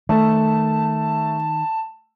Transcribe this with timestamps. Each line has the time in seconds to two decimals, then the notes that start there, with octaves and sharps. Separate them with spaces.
0.09 D#3 A3 A5